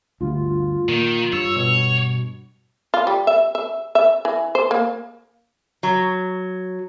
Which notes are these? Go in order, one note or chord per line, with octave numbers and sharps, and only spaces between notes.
D2 G2 F4
A#2 D#3
G2 C#5 E6
B2
F4
G3
E5
E5
E5
E3
C5
A#3
F#3